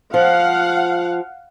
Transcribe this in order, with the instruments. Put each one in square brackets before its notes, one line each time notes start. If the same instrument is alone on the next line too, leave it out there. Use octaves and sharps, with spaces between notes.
[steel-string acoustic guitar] F3 [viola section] F5 F#5